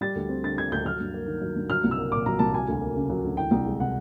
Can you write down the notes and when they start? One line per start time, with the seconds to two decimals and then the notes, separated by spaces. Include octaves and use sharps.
0.01 G3 A6
0.16 D2
0.29 C4
0.43 D3 A6
0.58 G3 G#6
0.72 D2 G6
0.85 F#3 F6
1.00 G2
1.14 A#3
1.27 D#3
1.42 F#3
1.56 G2
1.70 F#3 F6
1.84 C2
1.91 E6
1.98 A#3
2.11 A#2 D6
2.26 F#3 A#5
2.39 C2 A5
2.54 F#3 G#5
2.68 D2
2.82 A#3
2.96 C#3
3.10 F#3
3.24 D2
3.37 E3 G5
3.51 C2
3.66 G#3
3.80 C3 F#5